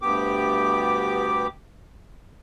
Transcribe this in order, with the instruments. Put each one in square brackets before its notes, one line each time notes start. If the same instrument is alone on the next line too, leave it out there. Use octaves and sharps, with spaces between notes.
[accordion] D2 G2 B3 G4 D6